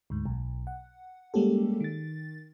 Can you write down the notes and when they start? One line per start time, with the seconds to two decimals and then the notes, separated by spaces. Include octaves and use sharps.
0.10 D2 G#2
0.26 B1
0.67 F#5
1.34 G3 G#3 A#3 C#4 G4 A4
1.81 D#3 A6